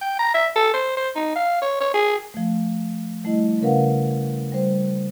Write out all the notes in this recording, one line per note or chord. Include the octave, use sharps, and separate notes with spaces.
G5
A#5
E5
A4
C5
C5
D#4
F5
C#5
C#5
G#4
F3 A3
G3 A3 E4 D#5
C#3 C#4 A#4 B4 F5 F#5
G3 C5